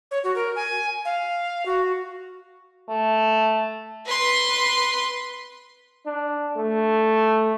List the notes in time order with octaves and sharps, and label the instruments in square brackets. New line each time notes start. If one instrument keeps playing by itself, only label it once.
[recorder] C#5
F#4
A#4
G#5
F5
F#4
[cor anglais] A3
[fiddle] B4 C6
[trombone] D4
A3